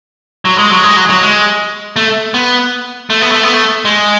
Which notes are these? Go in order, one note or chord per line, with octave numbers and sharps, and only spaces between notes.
F#3
G#3
F#3
G#3
F#3
F#3
G#3
A3
B3
A3
B3
A3
B3
A3
G#3